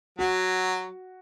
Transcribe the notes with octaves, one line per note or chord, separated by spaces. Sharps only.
F#3 F#4